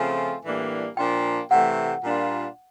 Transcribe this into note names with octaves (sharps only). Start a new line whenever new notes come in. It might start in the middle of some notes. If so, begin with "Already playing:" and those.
Already playing: C#3 F3 A3 C4 F4 G#5
A2 E3 G3 A#3 D4
A#2 F3 A#3 D4 F4 G5
C3 E3 A3 F#5
A#2 G3 A#3 D4 F4